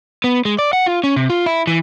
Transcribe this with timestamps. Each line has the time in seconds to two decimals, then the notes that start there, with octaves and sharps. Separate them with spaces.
0.24 B3
0.45 G#3
0.59 D5
0.73 F#5
0.86 F4
1.04 C#4
1.16 C3
1.30 F4
1.46 E4
1.67 E3